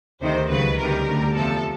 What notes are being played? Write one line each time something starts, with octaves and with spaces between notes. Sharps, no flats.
D2 C3 D#3 C5
C#2 C#3 F#3 B4
D2 C3 D#3 G3 A#4
D2 D3 G3
E2 C3 F3 A4